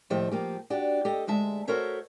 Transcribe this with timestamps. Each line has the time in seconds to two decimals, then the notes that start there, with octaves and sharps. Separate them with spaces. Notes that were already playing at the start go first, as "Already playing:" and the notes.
0.10 D#2 A2 F3 G4 D#5 E5
0.31 F3 A#3 G4
0.70 D4 F#4 G4
1.05 G4 A4 D#5
1.27 D2 G#3 E5 A5
1.67 F#4 A4 A#4 C5 C#5 E5